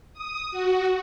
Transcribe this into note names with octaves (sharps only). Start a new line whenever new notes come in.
D#6
F#4